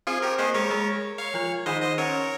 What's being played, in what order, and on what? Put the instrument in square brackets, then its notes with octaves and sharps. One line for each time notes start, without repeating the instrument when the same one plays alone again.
[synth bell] C4 C5 [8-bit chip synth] F4 G#4
[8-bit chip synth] G4 A#4
[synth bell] A#3 A#4 [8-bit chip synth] G#4 C5
[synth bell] G#3 G#4 [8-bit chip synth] A#4 C#5
[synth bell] G#3 G#4
[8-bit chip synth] C#5 F5
[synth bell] F3 F4
[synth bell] D#3 D#4 [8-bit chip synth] C5 D#5
[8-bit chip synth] C5 D#5
[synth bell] C#4 [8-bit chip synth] A#4 C#5